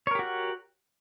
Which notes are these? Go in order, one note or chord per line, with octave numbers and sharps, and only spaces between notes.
F#4 G4 A#4 C#5 F#5